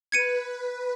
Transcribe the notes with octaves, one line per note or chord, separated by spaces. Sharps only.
B4 G#6 C#7 D#7